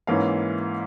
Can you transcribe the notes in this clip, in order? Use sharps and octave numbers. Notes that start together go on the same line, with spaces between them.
G#2 E3 A#3 C#4 F5